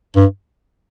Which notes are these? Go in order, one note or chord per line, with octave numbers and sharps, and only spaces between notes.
G2